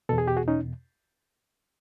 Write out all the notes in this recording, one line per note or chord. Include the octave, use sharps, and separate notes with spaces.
E2 B2 A4
G#4
G4
F#4 G#4
C#4 D#4